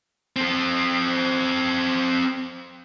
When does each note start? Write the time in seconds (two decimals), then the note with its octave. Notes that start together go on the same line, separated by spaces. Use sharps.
0.36 C4 A4